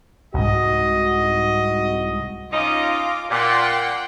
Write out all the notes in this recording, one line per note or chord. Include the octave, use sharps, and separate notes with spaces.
C2 G#2 F#4 D#5
C#4 D#4 F4 D#5 D6
A#2 F#5 G5 C6